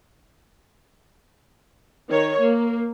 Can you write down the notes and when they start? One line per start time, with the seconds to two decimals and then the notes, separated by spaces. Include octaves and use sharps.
2.09 D#3 C#5
2.40 A#3